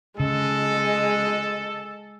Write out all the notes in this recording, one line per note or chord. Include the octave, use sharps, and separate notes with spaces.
C#3 G#3 A4 D#5